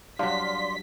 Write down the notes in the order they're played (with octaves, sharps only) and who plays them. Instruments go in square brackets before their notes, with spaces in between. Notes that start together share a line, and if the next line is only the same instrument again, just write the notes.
[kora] G2 F#3 [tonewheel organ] D5 C6 [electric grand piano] F5 [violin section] B6